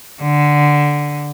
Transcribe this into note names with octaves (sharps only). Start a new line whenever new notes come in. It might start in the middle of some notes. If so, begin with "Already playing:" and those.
D3